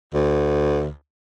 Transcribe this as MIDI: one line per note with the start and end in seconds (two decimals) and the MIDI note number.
0.14 0.90 38